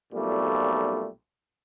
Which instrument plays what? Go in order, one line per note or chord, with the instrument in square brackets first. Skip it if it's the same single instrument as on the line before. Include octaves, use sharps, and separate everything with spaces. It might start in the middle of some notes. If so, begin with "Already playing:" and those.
[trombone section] B1 F2 A#2 G3 A3